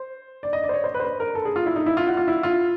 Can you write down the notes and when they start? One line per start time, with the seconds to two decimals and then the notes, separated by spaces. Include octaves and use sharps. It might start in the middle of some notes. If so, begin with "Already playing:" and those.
Already playing: C5
0.43 D5
0.53 D#5
0.64 D5
0.69 C5
0.74 C#5
0.84 C5
0.94 B4
1.00 C5
1.04 B4
1.20 A#4
1.35 A4
1.45 G#4
1.56 F4
1.66 E4
1.76 D#4
1.86 E4
1.97 F4
2.07 F#4
2.17 F4
2.28 E4
2.43 F4